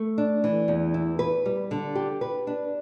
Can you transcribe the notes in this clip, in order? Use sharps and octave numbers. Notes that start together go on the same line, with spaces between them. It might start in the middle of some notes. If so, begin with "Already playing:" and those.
Already playing: A3
D4
E3
E2
E4
B4
G3
D3
G4
B4
D4